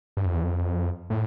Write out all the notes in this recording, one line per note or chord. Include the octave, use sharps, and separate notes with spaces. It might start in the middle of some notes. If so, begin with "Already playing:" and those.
G2
F2
E2
F2
A2